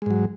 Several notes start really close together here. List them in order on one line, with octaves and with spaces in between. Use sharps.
G#3 G#2 F#3